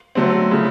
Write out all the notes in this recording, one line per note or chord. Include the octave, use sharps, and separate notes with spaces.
D3 F#3 A3 C4
C#3 F3 A3